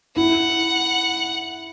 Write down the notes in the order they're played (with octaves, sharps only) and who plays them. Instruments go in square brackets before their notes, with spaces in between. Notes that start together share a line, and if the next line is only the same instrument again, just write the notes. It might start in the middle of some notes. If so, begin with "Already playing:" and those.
[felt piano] E4 [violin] F#5